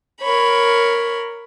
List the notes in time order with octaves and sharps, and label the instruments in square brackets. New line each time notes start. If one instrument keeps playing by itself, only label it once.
[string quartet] A#4 C#5 B5